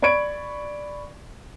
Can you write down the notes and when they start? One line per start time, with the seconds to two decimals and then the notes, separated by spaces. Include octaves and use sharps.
0.02 D5 B5 C#6 G#6 D7